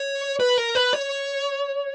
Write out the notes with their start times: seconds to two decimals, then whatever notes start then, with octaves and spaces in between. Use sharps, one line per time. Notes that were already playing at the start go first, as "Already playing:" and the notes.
Already playing: C#5
0.40 B4
0.58 A#4
0.75 B4
0.93 C#5